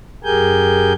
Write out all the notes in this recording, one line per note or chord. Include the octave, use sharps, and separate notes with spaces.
F#2 G4 G#4 A#4 G#5 G6